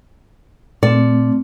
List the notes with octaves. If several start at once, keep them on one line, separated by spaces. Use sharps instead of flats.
A#2 A3 C4 D5